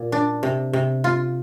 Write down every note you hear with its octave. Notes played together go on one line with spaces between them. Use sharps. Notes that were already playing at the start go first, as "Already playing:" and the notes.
Already playing: A#2
D4
C3
C3
F4